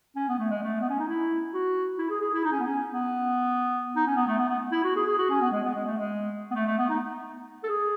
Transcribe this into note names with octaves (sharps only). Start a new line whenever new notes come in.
C#4
B3
A3
G#3
A3
B3
C#4
D#4
E4
F#4
E4
G#4
G#4
E4
D#4
C#4
B3
C#4
B3
D#4
C#4
B3
A3
B3
B3
E4
F#4
G#4
G#4
F#4
C#4
B3
G#3
B3
G#3
A3
G#3
B3
A3
A3
B3
D#4
A4
G#4